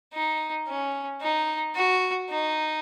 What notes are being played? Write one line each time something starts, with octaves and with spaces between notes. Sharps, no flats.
D#4
C#4
D#4
F#4
D#4